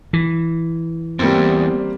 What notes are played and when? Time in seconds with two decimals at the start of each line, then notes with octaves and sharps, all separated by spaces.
0.13 E3
1.19 E2 G3 A#3 C4